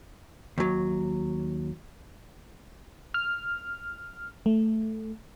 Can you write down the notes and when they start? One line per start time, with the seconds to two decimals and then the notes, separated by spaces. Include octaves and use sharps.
0.58 D#2 F#3
3.14 F6
4.46 A3